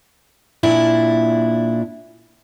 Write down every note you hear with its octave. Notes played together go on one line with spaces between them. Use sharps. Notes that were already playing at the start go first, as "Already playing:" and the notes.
A#2 D4 E4